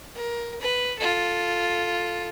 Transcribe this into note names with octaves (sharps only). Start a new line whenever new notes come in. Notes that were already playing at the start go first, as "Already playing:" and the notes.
A#4
B4
F4 A4